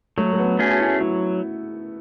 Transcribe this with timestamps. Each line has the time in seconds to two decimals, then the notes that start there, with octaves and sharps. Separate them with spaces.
0.17 F#3 A3
0.33 A3
0.38 B3
0.59 A3 C#4 F#4 G#4
0.71 F#4
0.80 E4
1.00 F#3 E4